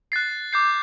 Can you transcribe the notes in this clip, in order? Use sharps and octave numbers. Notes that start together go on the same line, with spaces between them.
F#6 A6 C7
D6 G6 C7